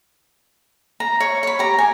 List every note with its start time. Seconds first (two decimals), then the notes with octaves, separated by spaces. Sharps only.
1.00 A#5
1.20 C#5
1.43 C#5 B5
1.59 G4 A#5
1.79 G#5